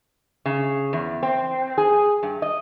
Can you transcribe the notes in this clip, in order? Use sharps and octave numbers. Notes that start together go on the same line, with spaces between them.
C#3
E2
C4
G#4
G2
D#5